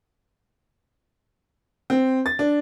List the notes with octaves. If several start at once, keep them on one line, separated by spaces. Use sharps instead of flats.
C4
A6
D4